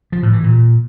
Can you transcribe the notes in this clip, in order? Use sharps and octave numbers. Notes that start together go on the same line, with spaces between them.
F3
A2
E3
A#2